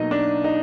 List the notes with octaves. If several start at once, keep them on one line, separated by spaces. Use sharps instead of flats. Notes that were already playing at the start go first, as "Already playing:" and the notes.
Already playing: B2 F#3 A#3 D#4 D#5
D4
D#4